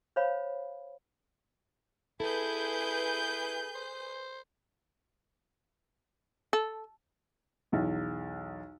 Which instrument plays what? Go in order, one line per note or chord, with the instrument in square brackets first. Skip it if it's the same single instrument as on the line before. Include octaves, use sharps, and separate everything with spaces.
[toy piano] C5 C#5 F5 B5
[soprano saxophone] E4 [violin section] G#4 B4 G6 [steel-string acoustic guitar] A4
[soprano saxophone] C5
[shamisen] A4
[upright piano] B1 E2